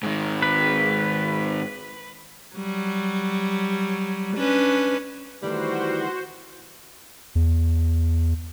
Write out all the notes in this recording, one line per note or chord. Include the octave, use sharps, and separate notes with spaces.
G#2 D#3
B4
F#3 G3
C#4 D4 B4
D#3 E3 G3 A3 F#4 C5
E2